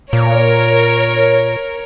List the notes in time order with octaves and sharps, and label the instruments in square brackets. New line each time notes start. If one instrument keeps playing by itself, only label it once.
[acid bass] A#2 [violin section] A#4 C#5